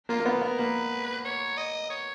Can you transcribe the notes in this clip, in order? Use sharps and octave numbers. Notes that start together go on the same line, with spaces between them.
A#3 F4
A#3
B3 F4
B3 A#4
A#3 B4
C#5
D#5
C#5